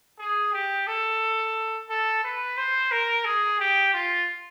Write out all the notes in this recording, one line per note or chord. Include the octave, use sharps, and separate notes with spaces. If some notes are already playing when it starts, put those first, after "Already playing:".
G#4
G4
A4
A4
B4
C5
A#4
G#4
G4
F4